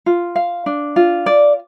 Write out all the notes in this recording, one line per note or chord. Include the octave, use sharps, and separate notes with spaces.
F4
F5
D4
F4
D5